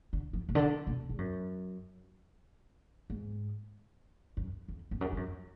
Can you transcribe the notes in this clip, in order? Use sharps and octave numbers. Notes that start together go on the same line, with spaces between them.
D3
F3
B2
D3
B2
G#2
F#2
G#2
F#2
F2
F2
F#2
G#2
F#2